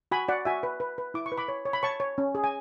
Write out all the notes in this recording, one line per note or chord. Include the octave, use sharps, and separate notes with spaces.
F#4 G#5 B5
F#4 D5 F#5
F#4 E5 G#5
B4
B4
B4
E4 D6
C#6
B4
B5 D6
C#5
C#5
B5
C#5 A5 C#6
C#5
C#4
G#4
G#5